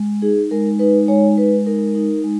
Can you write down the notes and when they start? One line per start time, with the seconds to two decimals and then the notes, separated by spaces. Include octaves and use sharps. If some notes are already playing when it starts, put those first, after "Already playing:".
Already playing: G#3
0.22 D#4 G#4
0.51 G#3 A#4
0.79 D#4 B4
1.08 G#3 C#5
1.37 G#3 B4
1.67 D#4 A#4
1.95 D#4
2.24 G#3